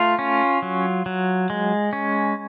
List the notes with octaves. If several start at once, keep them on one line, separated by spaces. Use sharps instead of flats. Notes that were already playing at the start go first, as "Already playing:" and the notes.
Already playing: A3 F4
C#4
F#3
F#3
G#3
C#4